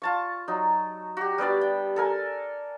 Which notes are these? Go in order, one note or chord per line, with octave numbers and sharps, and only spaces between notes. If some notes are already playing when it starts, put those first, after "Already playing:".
F4 A5 C#6
F#3 D#4
F#4 G4
G3 B3 D4 D5
G5
A4 A#4 G#5